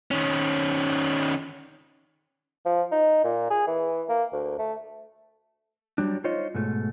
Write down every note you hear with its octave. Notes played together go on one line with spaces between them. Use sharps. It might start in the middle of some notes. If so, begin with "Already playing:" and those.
D#3 C#4
F3
D#4
A#2
G#4
E3
A#3
D2
A3
F#3 G3 D4
D#4 F4 C5 C#5 D#5
G#2 B2 A3